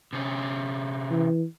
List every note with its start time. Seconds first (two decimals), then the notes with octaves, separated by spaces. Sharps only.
0.13 C3 C#4
1.11 E3